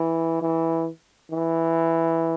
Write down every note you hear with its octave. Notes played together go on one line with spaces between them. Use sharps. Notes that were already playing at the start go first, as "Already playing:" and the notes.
Already playing: E3
E3
E3